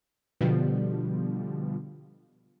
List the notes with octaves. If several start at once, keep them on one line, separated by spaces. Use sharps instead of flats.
B2 D3 F3 G3